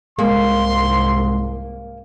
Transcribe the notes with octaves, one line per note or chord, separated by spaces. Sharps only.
C2 G#2 G#3 A#3 C6